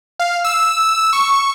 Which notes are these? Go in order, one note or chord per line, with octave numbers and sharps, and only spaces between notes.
F5
E6
C#6